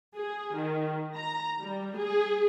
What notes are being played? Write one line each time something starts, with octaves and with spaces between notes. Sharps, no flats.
G#4
D#3
A#5
G3
G#4